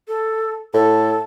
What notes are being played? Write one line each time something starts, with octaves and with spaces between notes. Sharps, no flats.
A4
A2 A4